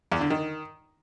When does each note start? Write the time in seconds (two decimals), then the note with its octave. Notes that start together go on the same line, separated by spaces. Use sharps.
0.12 E2
0.21 D3
0.30 D#3